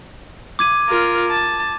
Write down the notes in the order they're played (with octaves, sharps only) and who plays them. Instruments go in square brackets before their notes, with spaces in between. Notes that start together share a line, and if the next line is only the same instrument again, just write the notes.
[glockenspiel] D6 G#6 D#7
[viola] F4 A#4
A5